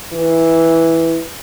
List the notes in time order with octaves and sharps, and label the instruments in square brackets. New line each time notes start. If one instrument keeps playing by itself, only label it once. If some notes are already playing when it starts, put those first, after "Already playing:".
[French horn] E3